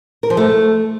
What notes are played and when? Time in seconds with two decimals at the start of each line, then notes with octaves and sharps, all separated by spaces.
0.23 A#4
0.30 F3
0.37 A3